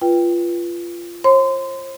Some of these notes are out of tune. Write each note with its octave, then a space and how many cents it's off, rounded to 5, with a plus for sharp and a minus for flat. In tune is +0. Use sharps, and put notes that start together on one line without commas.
F4 -20 B4 -15 G5 +5
C5 +40 C6 -30